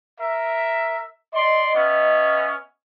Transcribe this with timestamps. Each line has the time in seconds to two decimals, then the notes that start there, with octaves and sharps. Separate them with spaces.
0.20 A#4 E5
1.34 D5 D#5 C6
1.75 B3 C#4 E5